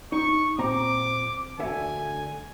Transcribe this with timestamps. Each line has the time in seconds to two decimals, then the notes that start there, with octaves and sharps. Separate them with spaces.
0.12 D#4 C#6
0.58 A#2 C4 A#5 D6
1.59 D2 D3 E5 G#5